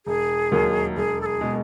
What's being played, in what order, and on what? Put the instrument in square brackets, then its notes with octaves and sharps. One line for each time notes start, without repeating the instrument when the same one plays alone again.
[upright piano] E1 [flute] G#4
[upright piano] D#2 D#3 F#3 A#3
[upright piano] E1 [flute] G#4
[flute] A4
G#4
[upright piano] B2 G#3